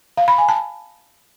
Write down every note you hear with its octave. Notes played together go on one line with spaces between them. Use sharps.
F5
B5
G#5
A5